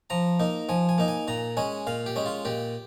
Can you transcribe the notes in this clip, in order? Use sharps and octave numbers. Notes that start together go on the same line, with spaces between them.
F3 A#5
A#3 D#4
F3 G#5
G#5
A#3 D#4
G#5
A#2 A#5
G#3 C#4 G#5
A#2 F5
G4
G#3 C#4
F4
A#2 G4